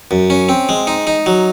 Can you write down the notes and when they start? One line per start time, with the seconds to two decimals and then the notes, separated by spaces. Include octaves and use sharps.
0.11 F#2
0.30 C#4
0.49 C4
0.69 G#3
0.87 D#4
1.07 D#4
1.26 F#3